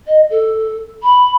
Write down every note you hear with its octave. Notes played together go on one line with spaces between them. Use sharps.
D#5
A4
B5